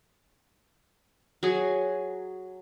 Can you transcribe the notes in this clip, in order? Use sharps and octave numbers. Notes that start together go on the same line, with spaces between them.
F#3 G#4